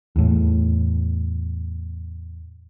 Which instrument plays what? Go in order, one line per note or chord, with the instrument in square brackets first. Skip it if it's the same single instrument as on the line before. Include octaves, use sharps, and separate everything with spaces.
[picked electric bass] E2 A2